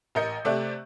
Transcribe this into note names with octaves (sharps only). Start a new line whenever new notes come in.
A1 A#4 D#5 G6 C#7
C3 A3 G4 D5 E5 F#6